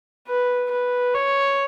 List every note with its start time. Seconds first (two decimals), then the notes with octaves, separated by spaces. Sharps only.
0.28 B4
0.71 B4
1.14 C#5